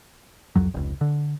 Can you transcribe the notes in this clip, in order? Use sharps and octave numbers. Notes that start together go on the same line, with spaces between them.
C2 F2 F#3
F1 C#2
D3